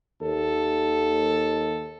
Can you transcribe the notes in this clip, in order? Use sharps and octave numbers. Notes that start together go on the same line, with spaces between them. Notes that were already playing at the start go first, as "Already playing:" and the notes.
D#2 A4